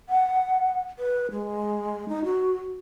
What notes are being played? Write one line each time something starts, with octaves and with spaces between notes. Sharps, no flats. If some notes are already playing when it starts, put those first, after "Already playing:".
F#5
B4
G#3
D#4
F#4